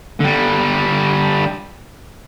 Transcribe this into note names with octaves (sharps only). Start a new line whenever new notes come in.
D3 G3